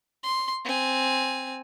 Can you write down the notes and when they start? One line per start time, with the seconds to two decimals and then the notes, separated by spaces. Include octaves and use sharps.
0.23 C6
0.65 C4 G#5